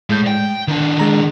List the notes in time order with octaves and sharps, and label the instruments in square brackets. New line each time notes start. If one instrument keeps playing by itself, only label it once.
[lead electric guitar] A2 [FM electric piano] G#3 G6
[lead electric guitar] G5
[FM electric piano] D3 [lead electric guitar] D#3 D4
[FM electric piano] G#3 A#5